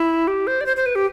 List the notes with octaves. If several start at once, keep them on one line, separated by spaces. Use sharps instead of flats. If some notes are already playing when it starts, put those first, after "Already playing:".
Already playing: E4
G4
C5
D5
C5
C5
B4
G4